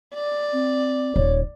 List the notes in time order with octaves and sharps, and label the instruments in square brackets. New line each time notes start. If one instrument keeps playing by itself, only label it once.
[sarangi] D5
[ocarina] C4
[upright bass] D#1 [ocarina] C#5